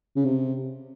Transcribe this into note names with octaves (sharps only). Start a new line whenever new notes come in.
C#3
C3